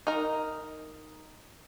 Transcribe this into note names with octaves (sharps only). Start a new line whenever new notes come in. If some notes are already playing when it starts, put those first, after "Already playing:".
D#4 A#4